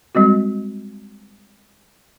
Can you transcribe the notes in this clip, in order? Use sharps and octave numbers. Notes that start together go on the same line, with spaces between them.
G3 G#3 C4 F#4